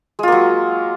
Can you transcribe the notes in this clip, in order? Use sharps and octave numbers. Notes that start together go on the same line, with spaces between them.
F#3 G#3 A#3 F4